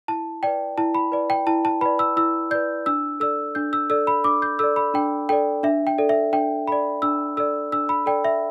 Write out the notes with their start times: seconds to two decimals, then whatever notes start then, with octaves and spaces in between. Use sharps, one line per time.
0.08 E4 A5
0.43 B4 D5 G5
0.78 E4 A5
0.95 B5
1.12 B4 D5
1.30 G5
1.47 E4 A5
1.65 A5
1.81 B4 D5 B5
1.99 E6
2.17 E4 E6
2.51 B4 D5 G6
2.86 D4 E6
3.20 A4 D5 E6
3.55 D4 G6
3.73 E6
3.90 A4 D5 E6
4.07 B5
4.24 D4 D6
4.42 G6
4.59 A4 D5 E6
4.76 B5
4.94 D4 G5
5.29 A4 D5 G5
5.63 D4 E5
5.87 G5
5.98 A4 D5
6.09 E5
6.33 D4 G5
6.67 A4 D5 B5
7.02 D4 E6
7.37 A4 D5 E6
7.72 D4 E6
7.89 B5
8.06 A4 D5 G5
8.25 E5